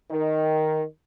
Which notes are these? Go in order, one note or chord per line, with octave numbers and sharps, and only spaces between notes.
D#3